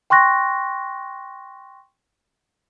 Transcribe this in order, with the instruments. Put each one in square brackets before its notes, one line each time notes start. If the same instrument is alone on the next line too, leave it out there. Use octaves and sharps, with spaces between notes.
[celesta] G5 C6 C#6 F#6 A#6